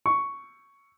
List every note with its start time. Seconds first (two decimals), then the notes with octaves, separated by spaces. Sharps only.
0.06 C#6